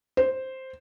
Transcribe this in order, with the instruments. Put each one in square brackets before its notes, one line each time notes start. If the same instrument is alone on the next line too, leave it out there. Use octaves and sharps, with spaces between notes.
[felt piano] C5